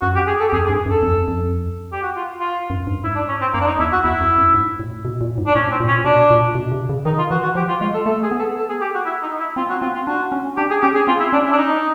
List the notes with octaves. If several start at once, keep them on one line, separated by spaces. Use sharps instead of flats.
F#2 F#4
G4
G#4
A4
G4
F2 G#4
G#4
G2
F#2
A4
F2
F2
G4
F#4
F4
F4
F#2
G2
G#2 E4
D4
C#4
C4
F#2 A#3
D4
D#4
E2 E4
F#4
E2 E4
F2
F#2
G#2
A2
B2
A#2
G#2
D4
A2 C#4
C4
A#2
C#4
B2 D4
A#2
B2
C3
C#3
D#3 D#4
F4
E3 F#4
F#4
F3 G4
F4
G#3 F4
A4
A3 A4
G#4
B3
A4
A4
G#4
G4
F#4
E4
D#4
E4
C4 F4
F#4
C4 F4
F4
D4 F#4
C#4
D4 G4
G#4
C#4 G4
G#4
C4 F4
E4
C#4 D4
E4
D4
D#4